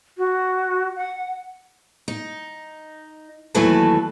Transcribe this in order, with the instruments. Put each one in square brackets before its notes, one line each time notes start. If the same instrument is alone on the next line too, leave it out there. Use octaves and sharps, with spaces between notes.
[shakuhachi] F#4
F#5
[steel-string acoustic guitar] D#4
D#2 E3 F#3 A3 B4 A5